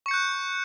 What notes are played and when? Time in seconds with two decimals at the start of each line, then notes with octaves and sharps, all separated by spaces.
0.06 C#6
0.08 C#7
0.11 G6
0.14 F#6